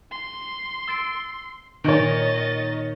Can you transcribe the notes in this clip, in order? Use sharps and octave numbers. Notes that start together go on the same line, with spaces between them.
C6
E6 A6 D7
A#2 D#3 C#5 D#5 G6 A6 D7